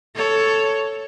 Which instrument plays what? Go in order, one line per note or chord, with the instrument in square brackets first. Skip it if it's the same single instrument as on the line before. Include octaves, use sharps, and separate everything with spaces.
[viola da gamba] A4 C#5